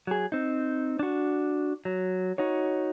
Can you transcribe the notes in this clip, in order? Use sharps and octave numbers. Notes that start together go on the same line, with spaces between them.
F#3 G#4
C4 D#4
D4 F#4
F#3
D#4 F#4 C#5